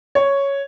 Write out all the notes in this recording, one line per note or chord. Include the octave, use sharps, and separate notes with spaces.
C#5